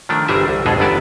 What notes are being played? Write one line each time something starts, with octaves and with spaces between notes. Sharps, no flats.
D#3 F3 A3 D4
G1 C2 E3 G3 G#4 E5
C2
G1 F2 B2 G#3 G#4 A4
G1 F#2 E3 B3 D5 A5